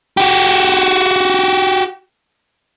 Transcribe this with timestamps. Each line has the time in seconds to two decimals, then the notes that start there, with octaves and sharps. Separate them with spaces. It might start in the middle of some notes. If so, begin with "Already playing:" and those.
0.17 F#4 G4